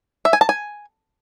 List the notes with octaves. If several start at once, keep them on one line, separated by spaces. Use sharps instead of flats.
E5
G#5
A5
G#5